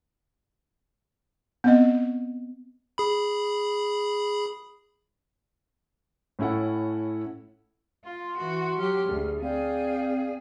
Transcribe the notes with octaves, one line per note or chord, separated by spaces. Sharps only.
B3 C4 D#5
G#4 B5
A2 C#4 E4 A4 F#5
F4 C6
E3 F#4
F#3 G4 F6
D2 G#4
C4 G#4 D5 F5 G5